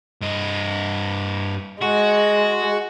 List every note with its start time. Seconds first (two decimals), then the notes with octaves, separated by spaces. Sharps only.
0.21 G2 D#5
1.81 G#3 F#4